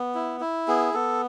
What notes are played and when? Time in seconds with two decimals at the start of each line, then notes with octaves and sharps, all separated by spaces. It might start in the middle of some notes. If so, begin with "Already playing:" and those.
Already playing: B3
0.15 E4
0.40 E4
0.68 B3 G#4
0.94 B3 A4